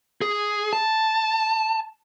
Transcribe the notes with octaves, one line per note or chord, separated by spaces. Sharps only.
G#4
A5